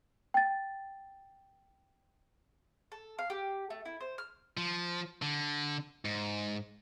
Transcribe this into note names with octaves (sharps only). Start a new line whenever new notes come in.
G5 A6
A4
F5
G4
A3
E4
C5
F6
F3
D3
G#2